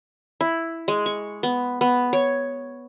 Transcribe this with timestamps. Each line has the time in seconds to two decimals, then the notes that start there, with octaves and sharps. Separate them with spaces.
0.41 E4
0.88 G#3
1.06 C#6
1.43 B3
1.81 B3
2.13 C#5